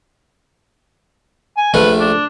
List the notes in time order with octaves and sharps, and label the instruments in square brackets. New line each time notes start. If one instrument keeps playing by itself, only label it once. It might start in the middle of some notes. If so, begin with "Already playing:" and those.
[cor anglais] G#5
[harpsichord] A#1 A3 [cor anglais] B4
[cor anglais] D4